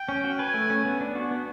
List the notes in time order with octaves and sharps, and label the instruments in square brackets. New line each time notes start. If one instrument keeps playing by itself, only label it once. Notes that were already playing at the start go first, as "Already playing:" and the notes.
Already playing: [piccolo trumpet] G5
[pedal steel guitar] C#4
F#4
[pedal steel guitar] B4 [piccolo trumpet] G#5
[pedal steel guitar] A3
C#4
B3
D4
F#4
B3